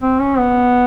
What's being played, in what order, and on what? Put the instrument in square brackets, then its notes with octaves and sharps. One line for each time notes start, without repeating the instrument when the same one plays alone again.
[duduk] C4
C#4
B3